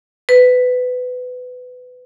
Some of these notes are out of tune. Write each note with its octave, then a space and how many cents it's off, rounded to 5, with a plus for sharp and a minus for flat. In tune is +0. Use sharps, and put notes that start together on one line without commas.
B4 +20